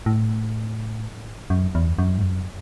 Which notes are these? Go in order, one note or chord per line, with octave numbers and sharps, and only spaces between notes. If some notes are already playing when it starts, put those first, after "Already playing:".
A2
F#2
E2
F#2
G#2
F#2